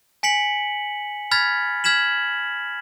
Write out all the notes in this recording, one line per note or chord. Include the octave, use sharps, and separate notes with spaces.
G#5 B6 C#7 F#7
B5 F6 G#6 A6 B6
F6 G#6 B6 E7 F#7